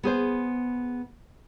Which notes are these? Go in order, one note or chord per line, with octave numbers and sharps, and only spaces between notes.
B3 G#4 C5